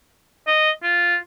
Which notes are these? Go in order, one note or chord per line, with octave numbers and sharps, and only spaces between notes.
D#5
F4